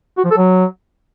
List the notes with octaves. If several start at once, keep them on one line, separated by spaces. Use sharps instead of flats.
F#4
F3
A4
F#3